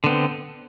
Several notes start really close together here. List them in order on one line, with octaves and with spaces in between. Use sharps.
D3 B3 C4